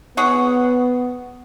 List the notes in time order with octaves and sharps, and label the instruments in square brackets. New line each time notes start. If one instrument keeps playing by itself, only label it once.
[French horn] B3 [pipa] G#4 C#5 F#5